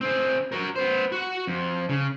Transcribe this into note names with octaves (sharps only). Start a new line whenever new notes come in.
C4 G#4
F#4 A#4
B3 C5
F#4 F#5
F2
C#3